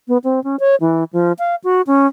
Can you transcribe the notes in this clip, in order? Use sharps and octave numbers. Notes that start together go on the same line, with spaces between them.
B3
C4
C#4
C#5
E3
F3
F5
F#4
C#4